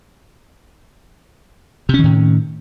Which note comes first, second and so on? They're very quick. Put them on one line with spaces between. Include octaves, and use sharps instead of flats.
C3 C#4 D#3 A2